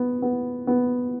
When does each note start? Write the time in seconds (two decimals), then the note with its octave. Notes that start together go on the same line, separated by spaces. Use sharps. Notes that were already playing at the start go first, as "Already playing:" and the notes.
Already playing: B3
0.22 B3
0.67 B3